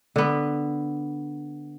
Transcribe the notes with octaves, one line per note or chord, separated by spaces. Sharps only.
D3 B3